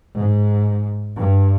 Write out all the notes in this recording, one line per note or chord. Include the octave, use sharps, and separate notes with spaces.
G#2
G2